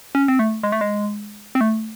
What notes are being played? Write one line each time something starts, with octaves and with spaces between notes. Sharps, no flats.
C#4
C4
A3
G#3
A3
G#3
C4
A3